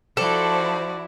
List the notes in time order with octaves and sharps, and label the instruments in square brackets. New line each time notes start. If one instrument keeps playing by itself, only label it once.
[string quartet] F3 E4 [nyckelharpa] F#4 D5 [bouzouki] A4 [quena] C5